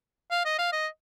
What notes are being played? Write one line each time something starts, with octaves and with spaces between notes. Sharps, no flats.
F5
D#5
F5
D#5